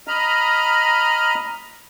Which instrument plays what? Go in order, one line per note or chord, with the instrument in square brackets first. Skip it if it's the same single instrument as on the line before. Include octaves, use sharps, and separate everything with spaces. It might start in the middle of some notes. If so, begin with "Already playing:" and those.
[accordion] D#5 A#5 B5 F6